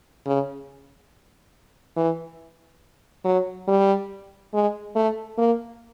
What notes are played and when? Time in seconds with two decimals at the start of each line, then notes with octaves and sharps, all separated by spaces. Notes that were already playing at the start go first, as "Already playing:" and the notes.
0.26 C#3
1.96 E3
3.24 F#3
3.68 G3
4.54 G#3
4.95 A3
5.38 A#3